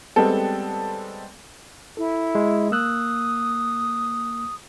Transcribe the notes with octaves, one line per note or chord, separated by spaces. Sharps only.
G3 G#3 B3 C4 A4
E4 A4
G#3
A#3 D#6 E6 F#6